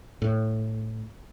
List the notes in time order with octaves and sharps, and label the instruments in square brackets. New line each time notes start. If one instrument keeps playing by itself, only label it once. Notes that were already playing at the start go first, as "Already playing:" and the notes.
[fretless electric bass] A2